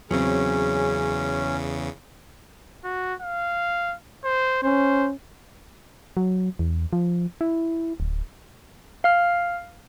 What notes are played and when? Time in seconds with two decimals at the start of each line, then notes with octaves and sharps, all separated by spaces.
0.11 E2 C#3 F#3 C4 C#4 G#4
2.84 F#4
3.21 F5
4.24 C5
4.63 C#4 C5
6.17 F#3
6.59 E2
6.93 F3
7.41 E4
8.00 D1
9.04 F5 F6